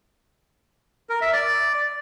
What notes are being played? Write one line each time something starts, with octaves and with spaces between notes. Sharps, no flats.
A#4
E5
D5